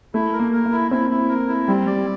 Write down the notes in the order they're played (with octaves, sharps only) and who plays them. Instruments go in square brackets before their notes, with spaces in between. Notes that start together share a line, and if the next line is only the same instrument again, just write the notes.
[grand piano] A3 [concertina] E4
[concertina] A#4
[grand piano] A#3
[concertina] A#4
[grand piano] A#3
[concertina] E4
[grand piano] C4 [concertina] E4
[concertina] E4
A#4
E4
[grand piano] G3 [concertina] C4
[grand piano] G3 [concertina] D5